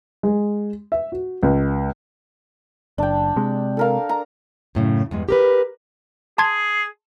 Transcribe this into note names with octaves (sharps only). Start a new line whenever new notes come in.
G#3
E5
F#4
C#2
F#1 D4 G5
C3 G#3
A4 A#4 F5
A#5
F#2 A2 C#3
E2 G2 G#3
G4 A#4 B4
G#4 A5 C6 G#6